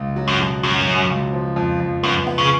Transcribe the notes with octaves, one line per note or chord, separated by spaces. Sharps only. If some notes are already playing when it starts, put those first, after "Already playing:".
Already playing: C#2
F#3
F#2
B2
F#2 F#3
F#3
C#2
F3
F2
F2
F#2 B3
B3
C#3